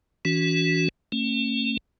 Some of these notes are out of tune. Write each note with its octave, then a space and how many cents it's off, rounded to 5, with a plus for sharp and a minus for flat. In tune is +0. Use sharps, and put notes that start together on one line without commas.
E3 -10 C#4 +40 F#4 +0
A3 +40 C#4 -30